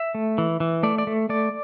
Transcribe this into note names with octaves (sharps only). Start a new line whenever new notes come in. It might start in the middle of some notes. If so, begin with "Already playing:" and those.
Already playing: E5
A3
E3
E3
A3 D5
D5
A3
A3 D5